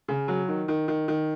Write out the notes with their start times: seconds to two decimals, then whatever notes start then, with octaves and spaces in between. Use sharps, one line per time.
0.08 C#3
0.28 F#3
0.48 D#3
0.68 D#3
0.88 D#3
1.08 D#3